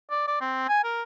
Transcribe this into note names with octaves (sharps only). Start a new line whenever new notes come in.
D5
D5
C4
G#5
A#4